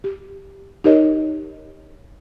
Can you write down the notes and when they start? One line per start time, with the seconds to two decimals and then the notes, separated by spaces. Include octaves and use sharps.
0.04 G4
0.84 D#4 G4 A#4 C#5 D#5